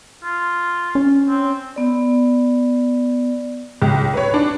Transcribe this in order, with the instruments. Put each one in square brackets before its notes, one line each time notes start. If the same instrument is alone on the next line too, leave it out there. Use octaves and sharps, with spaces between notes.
[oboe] F4
[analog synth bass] C#4
[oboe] C4
[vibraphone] B3 D5
[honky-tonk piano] C#2
B4 C#5
D4